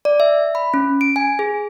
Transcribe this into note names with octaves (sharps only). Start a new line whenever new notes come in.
D5
E5
B5
C#4
D7
G#5
G#4